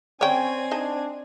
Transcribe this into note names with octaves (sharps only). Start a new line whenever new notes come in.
C4 C#4 C#5 D5 G5 G#5 A#5 C#6
D4 D#4 D#5 A5